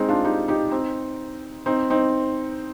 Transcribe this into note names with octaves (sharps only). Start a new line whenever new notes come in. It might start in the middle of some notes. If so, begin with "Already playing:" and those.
Already playing: G#3 C4 D#4
D4 F4
D#4 G4
D#4 G4
C4 D#4
C4 D#4
C4 D#4